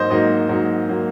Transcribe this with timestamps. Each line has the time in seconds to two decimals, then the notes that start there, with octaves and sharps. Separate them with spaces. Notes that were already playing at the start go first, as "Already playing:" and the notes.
Already playing: G#2 F#3 A#3 C5 D#5
0.10 G#2 F#3 A#3 D#5
0.49 G#2 F#3 A#3
0.89 F#3 A#3